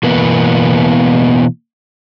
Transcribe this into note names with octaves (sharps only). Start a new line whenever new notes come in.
B2 E3 A#3 B3